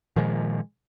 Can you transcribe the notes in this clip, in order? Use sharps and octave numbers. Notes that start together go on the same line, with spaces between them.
A#2 D#3 F3 G#3